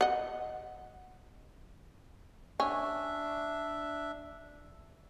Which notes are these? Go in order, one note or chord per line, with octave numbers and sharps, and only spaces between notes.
D#5 F#5
C#4 D4 E5